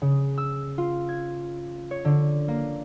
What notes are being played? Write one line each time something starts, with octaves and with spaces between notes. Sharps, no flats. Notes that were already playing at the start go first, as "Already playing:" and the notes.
C#3
E6
F4
G#6
C#5
D3
A#3